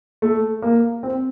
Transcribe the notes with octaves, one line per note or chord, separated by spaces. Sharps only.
A3
A#3
C4